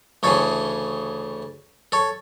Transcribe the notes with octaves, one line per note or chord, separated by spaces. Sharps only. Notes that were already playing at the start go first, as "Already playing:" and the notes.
D2 C#3 E3 A4 C#5
A4 C#5